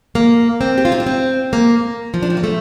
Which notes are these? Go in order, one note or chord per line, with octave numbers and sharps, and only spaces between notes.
A#3
C4
G4
F4
D#4
D4
C4
A#3
F3
D4
C4
A#3
A3